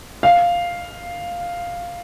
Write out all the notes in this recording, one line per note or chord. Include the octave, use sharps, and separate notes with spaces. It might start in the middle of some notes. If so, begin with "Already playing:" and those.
F5